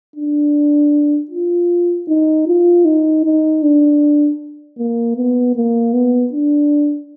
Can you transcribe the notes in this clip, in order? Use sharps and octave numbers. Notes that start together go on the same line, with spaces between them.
D4
F4
D#4
F4
D#4
D#4
D4
A#3
B3
A#3
B3
D4